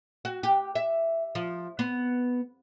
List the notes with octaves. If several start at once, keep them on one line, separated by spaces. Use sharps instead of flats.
F#4
G4
E5
F3
B3